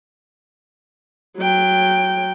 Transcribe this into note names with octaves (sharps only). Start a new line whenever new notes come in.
F#3 G5